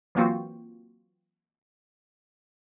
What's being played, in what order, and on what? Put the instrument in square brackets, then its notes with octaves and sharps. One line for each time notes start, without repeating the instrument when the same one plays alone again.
[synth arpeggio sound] E3 F#3 A#3 C4 F4 F#4